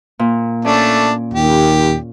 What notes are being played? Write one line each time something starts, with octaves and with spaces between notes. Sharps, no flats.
A#2
A3 C#4 D4 D5
D#2 G4